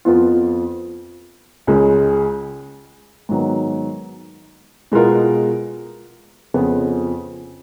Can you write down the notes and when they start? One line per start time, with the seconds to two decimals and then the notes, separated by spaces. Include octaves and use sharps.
0.05 F2 F3 B3 F4
1.67 C#2 C#3 G#3
3.29 G#2 D#3 F#3 B3
4.92 B2 G#3 B3 F4 A#4
6.54 F2 C#3 F3 B3